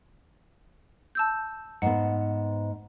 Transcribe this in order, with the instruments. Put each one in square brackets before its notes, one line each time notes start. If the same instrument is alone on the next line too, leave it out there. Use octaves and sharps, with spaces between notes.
[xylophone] A5 E6 G6
[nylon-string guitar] G#2 B3 [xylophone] F#5